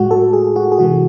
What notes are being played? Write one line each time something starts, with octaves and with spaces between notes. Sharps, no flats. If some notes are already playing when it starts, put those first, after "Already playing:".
Already playing: A2 G#3 F#4
A4
G#4
F#4
G#4
C3 E3 G#3 F#4